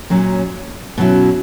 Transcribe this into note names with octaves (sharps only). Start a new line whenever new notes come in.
A#2 F#3 C#4
B2 F#3 C#4 E4